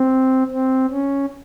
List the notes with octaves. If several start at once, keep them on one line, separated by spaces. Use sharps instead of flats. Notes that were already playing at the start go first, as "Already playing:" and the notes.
Already playing: C4
C4
C#4